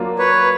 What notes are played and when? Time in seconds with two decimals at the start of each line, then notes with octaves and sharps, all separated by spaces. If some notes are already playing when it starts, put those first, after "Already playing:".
Already playing: F#3 A#3 D4 F4
0.19 B4 C#5